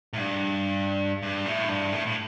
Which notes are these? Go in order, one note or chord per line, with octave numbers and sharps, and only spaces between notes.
A2
G2
G2
A2
G2
A2
A2